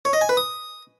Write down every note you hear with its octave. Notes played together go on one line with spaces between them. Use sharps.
C#5
D#5
G#5
B4
D#6